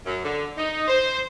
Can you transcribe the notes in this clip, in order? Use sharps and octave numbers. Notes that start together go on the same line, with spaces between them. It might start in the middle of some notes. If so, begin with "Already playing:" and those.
F#2
D3
D#4
C5